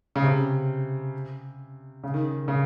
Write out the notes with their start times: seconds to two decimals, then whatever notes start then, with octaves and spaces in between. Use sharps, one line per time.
0.16 C#3
0.23 C3
2.03 C#3
2.14 D#3
2.48 C#3